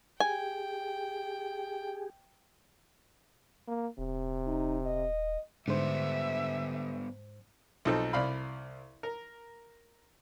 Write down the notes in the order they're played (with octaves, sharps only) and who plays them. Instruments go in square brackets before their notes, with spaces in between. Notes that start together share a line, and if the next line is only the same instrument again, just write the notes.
[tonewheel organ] G4 G#4 [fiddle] G5 [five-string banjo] G#5
[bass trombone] A#3
[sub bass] D#1 [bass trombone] C3
[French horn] D#4
D#5
[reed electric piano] G#2 C5 [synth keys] D3 [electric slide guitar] G3 B3 [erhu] E5
[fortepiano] B1 F3 C4 D#4 A4
C2 D5 F5 B5
A#4